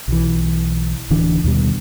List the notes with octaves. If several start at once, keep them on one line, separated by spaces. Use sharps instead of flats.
B1 E3
D1 D3 E3 D4
D#2 B2 G3